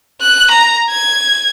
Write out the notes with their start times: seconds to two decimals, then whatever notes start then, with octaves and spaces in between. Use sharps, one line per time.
0.21 F#6
0.51 A#5
0.90 G#6